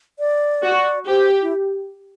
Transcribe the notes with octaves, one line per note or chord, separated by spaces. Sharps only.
D5
F#4
G4 C5
E4